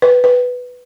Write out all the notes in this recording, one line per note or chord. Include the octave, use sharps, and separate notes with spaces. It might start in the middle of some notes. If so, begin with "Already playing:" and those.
B4
B4